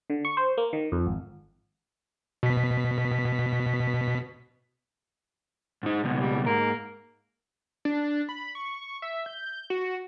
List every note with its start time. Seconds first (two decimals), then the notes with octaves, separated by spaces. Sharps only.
0.10 D3
0.25 C#6
0.37 C5
0.57 A#3
0.73 D#3
0.92 F2
1.06 G#1
2.43 B2 B6
5.83 G#2 D#4
6.04 C#2 B2
6.19 G3
6.46 G#2 A#3
7.85 D4
8.29 B5
8.55 C#6
9.02 E5
9.26 G6
9.70 F#4